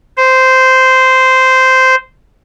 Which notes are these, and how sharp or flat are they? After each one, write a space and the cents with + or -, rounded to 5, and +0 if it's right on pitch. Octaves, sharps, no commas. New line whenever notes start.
C5 -10